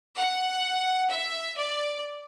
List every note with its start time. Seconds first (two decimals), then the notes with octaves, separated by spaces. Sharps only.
0.18 F#5
1.11 E5
1.58 D5